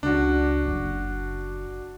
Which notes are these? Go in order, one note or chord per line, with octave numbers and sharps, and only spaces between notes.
C#2 D4 F#4
F#1